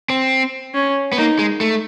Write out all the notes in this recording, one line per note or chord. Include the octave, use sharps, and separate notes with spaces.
C4
C#4
B3
A#3 D#4
G#3
A3